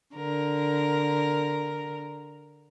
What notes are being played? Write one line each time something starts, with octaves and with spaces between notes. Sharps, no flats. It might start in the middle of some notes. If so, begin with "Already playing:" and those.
D3 A#4